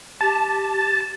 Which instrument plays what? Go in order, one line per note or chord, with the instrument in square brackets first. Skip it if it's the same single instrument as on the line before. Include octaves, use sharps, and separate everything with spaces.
[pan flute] G4 [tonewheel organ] A5